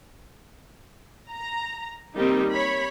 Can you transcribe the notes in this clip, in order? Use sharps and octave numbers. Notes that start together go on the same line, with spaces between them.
A#5
D#3 G3 A#3 C4 D#4
C#5 B5